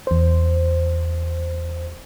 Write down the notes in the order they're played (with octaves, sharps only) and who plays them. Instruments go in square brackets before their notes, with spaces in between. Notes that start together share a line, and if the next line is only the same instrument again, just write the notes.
[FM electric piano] E2 C5